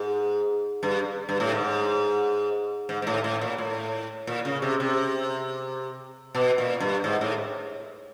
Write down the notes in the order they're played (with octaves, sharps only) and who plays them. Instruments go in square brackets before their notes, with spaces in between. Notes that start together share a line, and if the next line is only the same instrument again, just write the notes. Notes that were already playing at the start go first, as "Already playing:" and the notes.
Already playing: [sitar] G#2
G2
G2
A2
G#2
G#2
G#2
A2
A2
A#2
A2
A#2
C#3
C3
C3
B2
A#2
G2
G#2
A2